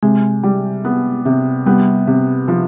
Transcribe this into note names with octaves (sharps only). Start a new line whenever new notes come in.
C3 G#3
G3
B3
C3
G3 B3
C3
F3